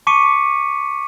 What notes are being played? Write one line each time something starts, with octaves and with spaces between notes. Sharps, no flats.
A5 C#6 D6 B6 C#7 D#7